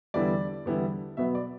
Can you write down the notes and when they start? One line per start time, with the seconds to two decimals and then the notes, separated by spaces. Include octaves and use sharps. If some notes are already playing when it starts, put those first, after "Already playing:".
0.14 E2 D3 G3 B3 E4 D5
0.66 E2 D3 G3 B3 E4
1.17 B2 F#3 B3 E5
1.35 D5